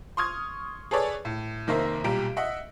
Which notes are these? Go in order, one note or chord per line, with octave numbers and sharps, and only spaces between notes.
C6 C#6 D#6 F6 G#6
G#4 A4 B4 C#5 D5
A2
F1 D#3 A#3 A#4 C5 E5
B1 A#2 G3 G4 A#5 D7
D#5 E5 F#5